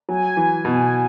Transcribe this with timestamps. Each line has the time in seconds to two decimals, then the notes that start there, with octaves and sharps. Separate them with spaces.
0.09 F#3 G#5
0.37 E3
0.65 B2